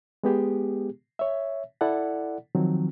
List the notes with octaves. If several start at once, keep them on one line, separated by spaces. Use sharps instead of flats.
G#3 B3 G4 G#4
C#5 E5
E4 A4 D5 F#5
D#3 F3 F#3 C4